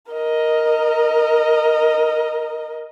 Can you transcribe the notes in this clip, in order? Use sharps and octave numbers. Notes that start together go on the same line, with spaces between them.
A#4 D#5